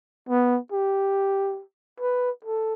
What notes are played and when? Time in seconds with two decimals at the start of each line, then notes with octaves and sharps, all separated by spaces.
0.29 B3
0.72 G4
2.00 B4
2.44 A4